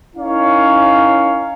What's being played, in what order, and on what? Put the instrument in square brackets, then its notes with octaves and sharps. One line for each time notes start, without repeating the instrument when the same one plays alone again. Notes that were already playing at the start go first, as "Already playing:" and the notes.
[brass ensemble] C#4 D#4 E4 A#4 C#5 F5